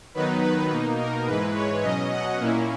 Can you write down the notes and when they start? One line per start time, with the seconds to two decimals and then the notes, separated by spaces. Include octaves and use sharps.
0.14 D#3 F#3 B3 D#4 B4
0.43 B4
0.70 B2 A#3 D#4
0.99 A#4
1.26 G#2 E3 G#3 B4
1.54 C#5
1.82 B2 F#3 C#4 D#5
2.11 F#5
2.39 A#2 A#3 C#4 E4